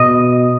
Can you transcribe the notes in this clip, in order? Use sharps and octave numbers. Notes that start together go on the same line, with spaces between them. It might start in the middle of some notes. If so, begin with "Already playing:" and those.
Already playing: B2 D#5